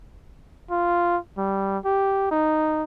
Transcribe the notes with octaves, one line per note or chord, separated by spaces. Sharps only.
F4
G3
G4
D#4